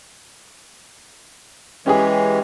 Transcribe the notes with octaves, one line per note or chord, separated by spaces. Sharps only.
E3 G#3 C#4 G4 G#4